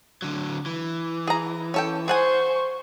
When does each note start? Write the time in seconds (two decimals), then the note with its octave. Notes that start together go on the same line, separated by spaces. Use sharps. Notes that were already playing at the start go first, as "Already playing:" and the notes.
0.22 D3 F#3
0.66 E3
1.27 G#4 A#5
1.74 C#4 A4 G5
2.08 G#4 C5 F#5 G#5 C#6